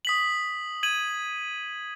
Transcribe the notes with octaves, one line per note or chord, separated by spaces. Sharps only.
D#6 B6 F#7
G#6 D#7 F#7